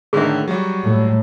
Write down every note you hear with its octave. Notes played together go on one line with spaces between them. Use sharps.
A2 D3 D#3 G#4 E5
F#3 G3 F#4
A2